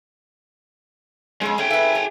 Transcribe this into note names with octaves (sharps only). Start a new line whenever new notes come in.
F2 G#2 G#3 C#4
A3 C#4 G#4 G5
B4 E5
C#5